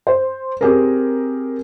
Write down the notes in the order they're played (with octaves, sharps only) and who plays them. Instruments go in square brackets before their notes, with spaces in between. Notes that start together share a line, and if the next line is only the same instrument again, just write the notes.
[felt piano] C5
C4 G4 G#4 A#4